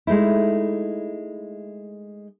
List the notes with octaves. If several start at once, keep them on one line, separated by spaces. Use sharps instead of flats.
G#3 A3 D#4 E4